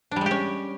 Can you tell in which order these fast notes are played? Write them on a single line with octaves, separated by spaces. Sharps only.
D4 G3 G#3 G4 C#4